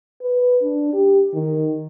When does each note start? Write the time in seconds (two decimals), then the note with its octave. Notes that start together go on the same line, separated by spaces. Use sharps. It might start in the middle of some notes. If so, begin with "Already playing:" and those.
0.21 B4
0.61 D4
0.93 G4
1.34 D#3